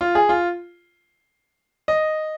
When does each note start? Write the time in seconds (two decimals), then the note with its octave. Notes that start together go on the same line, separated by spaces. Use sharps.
0.01 F4
0.15 G#4
0.29 F4
1.88 D#5